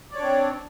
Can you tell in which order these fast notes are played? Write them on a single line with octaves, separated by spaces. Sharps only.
D5 C#5 D4 C4